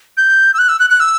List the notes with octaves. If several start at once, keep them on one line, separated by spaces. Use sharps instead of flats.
G6
E6
F#6
E6
F#6
F#6
E6